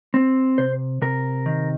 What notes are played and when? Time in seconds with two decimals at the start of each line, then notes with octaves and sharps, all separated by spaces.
0.14 C4
0.58 C3 C5
1.02 C3 A#4
1.46 D#3